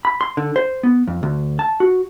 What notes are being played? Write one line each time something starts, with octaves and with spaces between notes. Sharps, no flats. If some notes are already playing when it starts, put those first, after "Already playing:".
B5
C6
D3
C5
B3
F2
D2
A5
F#4